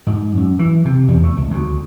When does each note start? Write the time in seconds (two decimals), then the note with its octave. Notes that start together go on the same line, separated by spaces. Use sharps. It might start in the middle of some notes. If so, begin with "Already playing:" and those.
0.07 G#2
0.37 F#2
0.59 E3
0.85 C3
1.08 E2
1.24 A3
1.37 C#2
1.50 D2